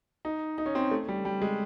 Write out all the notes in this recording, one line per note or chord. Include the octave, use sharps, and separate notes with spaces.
D#4
D#4
C#4
C4
A3
G3
G3
G#3